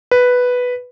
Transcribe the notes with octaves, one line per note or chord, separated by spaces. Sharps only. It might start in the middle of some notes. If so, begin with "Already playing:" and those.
B4